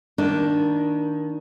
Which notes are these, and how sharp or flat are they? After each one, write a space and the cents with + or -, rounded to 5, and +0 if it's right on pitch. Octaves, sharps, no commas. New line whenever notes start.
D#3 +15 A#3 +0 D4 +0